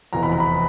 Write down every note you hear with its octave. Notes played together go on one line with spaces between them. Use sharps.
F1 E2 B2 A#5
B5
A#5
B5